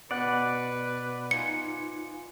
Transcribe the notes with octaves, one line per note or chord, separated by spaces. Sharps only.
B2 B4 D5 F#5 F#6
D#4 F4 G#5 C#7